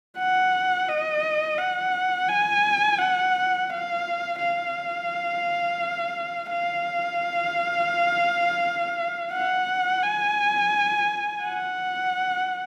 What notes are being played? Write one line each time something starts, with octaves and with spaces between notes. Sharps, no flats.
F#5
D#5
F#5
G#5
F#5
F5
F5
F5
F#5
G#5
F#5